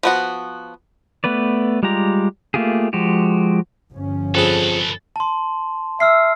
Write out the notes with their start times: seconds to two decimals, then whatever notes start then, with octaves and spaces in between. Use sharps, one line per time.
0.03 F3 B3 F#4
1.24 A3 B3 B4 D5
1.83 G3 G#3 F4 G4 A#5
2.54 A3 A#3 F4 G4 G#4
2.93 F3 G#3 F#4 G4
3.91 G1 F3 C#4
4.35 F2 G#4 A4 B4
5.16 A5 C6
6.00 E5 E6 F6 C7